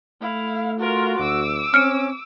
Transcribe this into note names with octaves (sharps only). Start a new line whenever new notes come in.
A3 E4 F5
F4 F#4 A#4
D2 D6 E6
C4 C#4 F6 C#7 D7